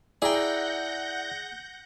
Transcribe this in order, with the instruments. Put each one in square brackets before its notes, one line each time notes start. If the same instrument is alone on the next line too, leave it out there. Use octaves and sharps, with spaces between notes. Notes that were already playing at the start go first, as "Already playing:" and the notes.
[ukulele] E4 [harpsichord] G#4 G5 [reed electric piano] D5 A#5 [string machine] F#5 G6 A#6